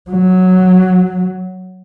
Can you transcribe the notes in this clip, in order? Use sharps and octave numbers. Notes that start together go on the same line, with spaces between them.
F#3